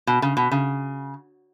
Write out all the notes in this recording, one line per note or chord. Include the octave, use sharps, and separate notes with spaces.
B2
C#3
B2
C#3